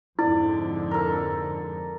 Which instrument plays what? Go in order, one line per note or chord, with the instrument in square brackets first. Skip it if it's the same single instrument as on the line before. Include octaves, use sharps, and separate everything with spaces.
[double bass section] F2 G#2 D3 [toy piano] E4 [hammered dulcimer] D5
[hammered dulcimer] A4 A#4